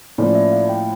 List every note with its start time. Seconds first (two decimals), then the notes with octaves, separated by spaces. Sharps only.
0.18 A2 F3 A#3 C#4 D5
0.29 D5
0.35 E5
0.52 F5
0.69 G5